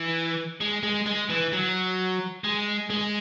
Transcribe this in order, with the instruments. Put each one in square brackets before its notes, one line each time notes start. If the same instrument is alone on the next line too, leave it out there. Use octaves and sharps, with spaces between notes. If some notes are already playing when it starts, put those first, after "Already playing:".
Already playing: [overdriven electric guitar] E3
G#3
G#3
G#3
E3
F#3
G#3
G#3